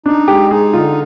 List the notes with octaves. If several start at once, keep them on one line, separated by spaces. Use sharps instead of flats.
D4 D#4
G#3 G4
D#4 G#4
D3 F4